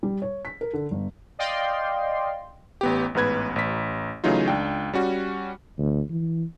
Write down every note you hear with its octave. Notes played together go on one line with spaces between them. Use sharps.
G3
C#5
B6
A#4
D3
G1
D5 D#5 F5 G5 C6
A1 B3 G4
A1 G#2 B3 B4 G#6
A1 B6
C#3 E3 F#3 A3 D#4 F4
C#2 D4 G5
G3 C#4 F#4
D2
E3